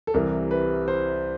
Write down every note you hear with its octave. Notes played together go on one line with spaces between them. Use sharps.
A4
C2 C3 E3 A#4
B4
C5